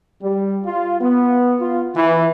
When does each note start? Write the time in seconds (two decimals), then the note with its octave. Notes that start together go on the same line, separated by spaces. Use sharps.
0.22 G3
0.65 F4
1.01 B3
1.60 F4
1.95 E3